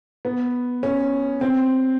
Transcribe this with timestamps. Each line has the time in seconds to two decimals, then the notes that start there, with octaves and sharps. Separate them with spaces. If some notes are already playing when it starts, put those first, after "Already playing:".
0.25 B3
0.83 C#4
1.41 C4